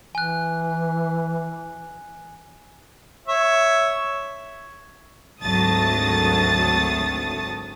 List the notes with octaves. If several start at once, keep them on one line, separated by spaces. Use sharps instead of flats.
E3 G#5 F#6
C#5 E5
G#1 D2 F#3 A5 D#6 A6